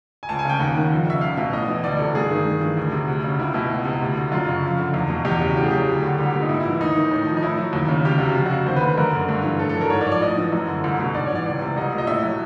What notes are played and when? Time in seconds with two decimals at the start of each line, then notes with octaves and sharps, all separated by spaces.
0.23 G#5
0.29 C#2 A5
0.39 G#5
0.45 C#3 G5
0.59 D#2 F#5
0.76 D#3
0.91 F2
1.06 C#3 E5
1.21 C#2 F5
1.37 B2 E5
1.53 A2 D#5
1.68 E3
1.84 D2 D5
1.99 C3 A4
2.15 G2 G#4
2.31 D#3
2.45 G2
2.61 E3
2.77 D2
2.92 C3
3.08 D2
3.24 C#3
3.39 C#2 E4
3.54 B2 E4
3.70 C#2
3.85 C3
4.01 D2
4.17 D3
4.32 F#2 F4
4.48 C#3
4.63 F2
4.78 D3
4.94 E2
5.10 B2
5.25 E2 G4
5.40 C#3 F#4
5.56 A2 G4
5.63 G#4
5.71 F#3 G4
5.87 D2
6.03 D3
6.18 C2 G4
6.34 A#2
6.41 D#4
6.49 G#2 E4
6.60 E4
6.65 E3
6.81 D#2 D#4
6.95 D#3
7.11 A2
7.26 F3
7.37 D#4
7.43 A2 E4
7.58 F#3
7.73 D#2
7.88 C#3
8.04 D2 G4
8.18 C3 F#4
8.32 F2 F4
8.46 F#4
8.51 C#3
8.66 D#2 C5
8.76 B4
8.81 D3
8.88 B4
8.98 F#2 A#4
9.13 D3
9.29 G2
9.44 E3
9.59 A2 A4
9.69 A4
9.75 F#3
9.81 A#4
9.90 G#2 C#5
10.01 D5
10.06 F3 C#5
10.12 D5
10.21 A2 D#5
10.38 E3
10.52 F#2
10.68 D3
10.84 C2
10.99 B2
11.14 G#2 D5
11.26 E3 C#5
11.35 D5
11.46 C#2
11.62 C3
11.76 C2 D#5
11.92 A#2
11.98 D#5
12.07 A2 E5
12.23 F#3